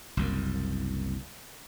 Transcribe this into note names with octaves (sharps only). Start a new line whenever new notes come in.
F#1 C2 F#2